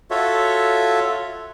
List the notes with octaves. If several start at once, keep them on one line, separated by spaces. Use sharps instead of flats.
F4 F#4 A4 C#5 E5